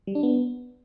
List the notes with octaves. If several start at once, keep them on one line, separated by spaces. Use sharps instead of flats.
G3
D4
B3